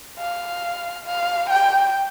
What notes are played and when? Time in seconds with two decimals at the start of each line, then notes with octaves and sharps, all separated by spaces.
0.19 F5
1.06 F5
1.50 G5